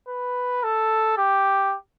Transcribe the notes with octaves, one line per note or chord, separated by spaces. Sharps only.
B4
A4
G4